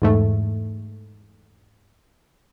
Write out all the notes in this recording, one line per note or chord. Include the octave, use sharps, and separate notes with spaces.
E2 G#2 A3